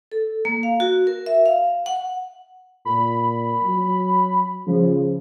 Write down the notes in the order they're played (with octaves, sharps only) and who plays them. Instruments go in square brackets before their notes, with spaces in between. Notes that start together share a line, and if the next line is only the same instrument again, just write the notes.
[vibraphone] A4
A#3
F5
F#4
A#4
E5
F5
F#5
[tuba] A#2 [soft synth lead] B5
[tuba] F#3
[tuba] C#3 [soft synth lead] F3